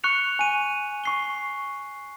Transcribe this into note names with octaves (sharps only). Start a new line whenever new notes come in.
C#6 F#6 C#7 F7
G#5 D#7
C#6 C7 G7